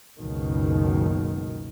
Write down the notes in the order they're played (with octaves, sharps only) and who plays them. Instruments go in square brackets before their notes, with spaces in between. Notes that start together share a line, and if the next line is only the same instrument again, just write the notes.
[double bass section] F#1 C#2 B2 D#3